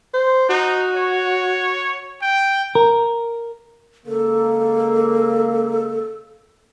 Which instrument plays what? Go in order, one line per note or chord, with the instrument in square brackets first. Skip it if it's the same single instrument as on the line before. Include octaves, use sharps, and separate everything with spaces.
[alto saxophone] C5
[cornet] D#4 [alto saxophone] F#4
[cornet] C#5
G5
[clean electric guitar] A#4
[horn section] C#3 G#3 A#3 [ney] A4